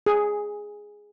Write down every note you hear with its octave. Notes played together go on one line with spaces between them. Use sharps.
G#4